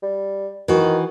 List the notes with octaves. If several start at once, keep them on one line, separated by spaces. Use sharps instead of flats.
G3
D#3 E3 F#4